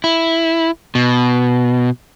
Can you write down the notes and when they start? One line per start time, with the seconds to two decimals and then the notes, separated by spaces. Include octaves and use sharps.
0.04 E4
0.95 B2